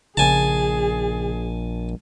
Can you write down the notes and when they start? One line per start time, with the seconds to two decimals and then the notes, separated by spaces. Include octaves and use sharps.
0.17 A#1 C#3 G#4 G#5 A5